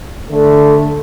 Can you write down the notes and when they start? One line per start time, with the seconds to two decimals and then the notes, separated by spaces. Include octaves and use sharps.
0.30 D3 A3